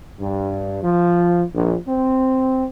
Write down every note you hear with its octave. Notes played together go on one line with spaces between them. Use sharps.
G2
F3
A#1
C4